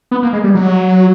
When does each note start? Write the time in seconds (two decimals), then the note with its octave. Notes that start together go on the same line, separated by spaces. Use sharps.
0.11 B3
0.23 A#3
0.33 G#3
0.44 G3
0.55 F#3